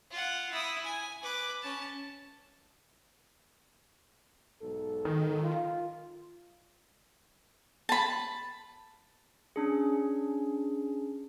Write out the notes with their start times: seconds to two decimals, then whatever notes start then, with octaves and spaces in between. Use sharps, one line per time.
0.11 F4 F#5
0.52 E4 D#6
0.84 G#5
1.23 B4 D6
1.62 C#4 A5
4.62 B1 G#2 A4
5.05 D#3
5.42 F4
7.89 A5 B5
9.56 C#4 D4 G#4